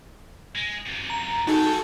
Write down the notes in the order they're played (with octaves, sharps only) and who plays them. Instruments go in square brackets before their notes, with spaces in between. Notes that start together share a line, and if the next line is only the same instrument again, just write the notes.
[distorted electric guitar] G#3
F#2 C3
[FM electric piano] A#5
[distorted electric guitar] G3 G5 [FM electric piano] D#4 [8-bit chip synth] F#4 G#4 A4 [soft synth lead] A5